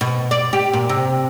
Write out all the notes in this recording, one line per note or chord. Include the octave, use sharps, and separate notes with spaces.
B2
D5
G4
A#2
C3